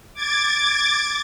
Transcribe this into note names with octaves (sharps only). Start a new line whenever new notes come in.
D6 G#6 A6